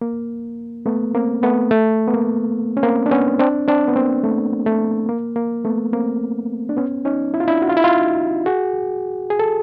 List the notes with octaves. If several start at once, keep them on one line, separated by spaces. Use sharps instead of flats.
A#3
A3 B3
A#3 C4
A3 B3
A3
B3
A#3
C#4
A#3 C4
D4
B3 C#4
C4 D4
C4 D4
B3
A#3 C4
A3
A3
A#3
A#3
A3 B3
A#3 C4
D4
B3 C#4
C#4 D#4
E4
F4
D4 E4
F#4
F4
E4
D#4 F4
F#4 G#4
G#4
A4